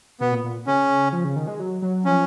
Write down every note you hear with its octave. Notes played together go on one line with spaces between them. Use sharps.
B2 B3
A#2
A#2
C#3 C#4
F3
C#3
D#3
G#3
F#3
F#3
F3 C#4